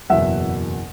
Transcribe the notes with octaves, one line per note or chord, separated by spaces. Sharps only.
F#1 E2 B2 F#3 E5 F#5